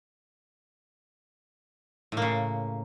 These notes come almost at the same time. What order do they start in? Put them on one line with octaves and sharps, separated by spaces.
A2 A#3 C#3